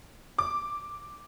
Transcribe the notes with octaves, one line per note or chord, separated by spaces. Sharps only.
D6